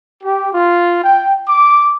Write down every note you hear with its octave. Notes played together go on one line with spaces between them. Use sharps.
G4
F4
G5
D6